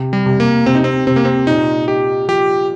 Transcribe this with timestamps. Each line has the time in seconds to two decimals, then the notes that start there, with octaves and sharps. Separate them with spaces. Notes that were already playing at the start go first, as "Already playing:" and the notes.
Already playing: C3
0.13 G3
0.26 C3
0.40 A#3
0.66 C3 C4
0.75 D#4
0.84 C4
1.07 C3 C4
1.16 A#3
1.25 C4
1.47 A#2 D#4
1.88 D#4 G4
2.28 F3 G4